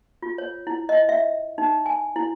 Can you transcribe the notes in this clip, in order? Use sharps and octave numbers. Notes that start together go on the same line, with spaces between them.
F4
C#5
E4
D#5
E5
D#4
G#5
E4